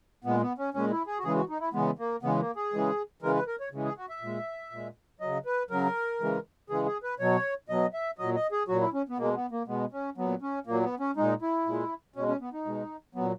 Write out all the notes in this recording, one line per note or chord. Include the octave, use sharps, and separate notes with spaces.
A#2 G#3 B3
B3
C#4
A#2 G#3 C#4
E4
G#4
F#4
C#3 E3 G#3 G#4
F#4
D#4
E4
C#3 E3 G#3 B3
A#3
C#3 E3 G#3 B3
A#3
G#4
C#3 E3 G#3
C#3 E3 G#3 A#4
B4
A#4
C#5
C#3 E3 G#3
G#4
F#4
E5
A#2 G#3
A#2 G#3
C#3 F#3 D#5
B4
C#3 F#3 A#4
C#3 E3 G#3
C#3 E3 G#3 G#4
G#4
B4
B2 F#3 C#5
B2 F#3 D#5
E5
A#2 F#3 D#5
D#5
G#4
A#2 F#3 F#4
E4
C#4
B3
B2 G#3 A#3
B3
A#3
B2 G#3 B3
C#4
A#2 F#3 B3
C#4
A#2 F#3 A#3
B3
C#4
A#2 G#3 D#4
E4
A#2 G#3
B2 G#3 C#4
C#4
B3
D#4
B2 G#3
A#2 F#3 B3